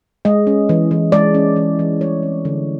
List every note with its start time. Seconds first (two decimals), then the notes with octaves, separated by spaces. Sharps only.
0.25 G#3 D#5
0.47 C#4
0.69 E3
0.91 E3
1.12 G#3 D5
1.34 C#4
1.56 E3
1.79 E3
2.00 G3 C#5
2.23 C4
2.45 D3